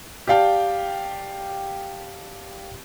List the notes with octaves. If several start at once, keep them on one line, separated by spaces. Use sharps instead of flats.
G4 D5 F5 G5 A5